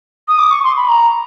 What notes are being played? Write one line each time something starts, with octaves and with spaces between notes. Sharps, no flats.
D#6
D6
C#6
C6
B5
A#5